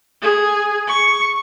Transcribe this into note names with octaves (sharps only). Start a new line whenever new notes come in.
G#4
C#6